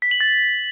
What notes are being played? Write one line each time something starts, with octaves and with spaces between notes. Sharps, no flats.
B6
F#7
A6